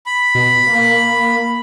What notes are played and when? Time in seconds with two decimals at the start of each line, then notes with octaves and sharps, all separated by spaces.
0.06 B5
0.35 B2
0.67 A#3